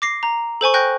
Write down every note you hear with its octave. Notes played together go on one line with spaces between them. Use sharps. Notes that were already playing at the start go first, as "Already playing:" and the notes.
D6 A#6 C7
A#5
A4 C5 G#5 C#6
G5 C#6 F#6 G6 A#6